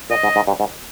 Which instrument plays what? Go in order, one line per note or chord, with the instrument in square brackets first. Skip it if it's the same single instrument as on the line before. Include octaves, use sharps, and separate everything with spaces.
[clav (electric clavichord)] A#2 [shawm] D#5
[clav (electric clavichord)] G#2
G#2
G2
G#2